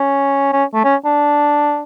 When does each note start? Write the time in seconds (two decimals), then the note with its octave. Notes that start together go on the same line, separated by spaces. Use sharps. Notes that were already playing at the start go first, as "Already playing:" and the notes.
Already playing: C#4
0.53 C#4
0.74 A3
0.84 C#4
1.05 D4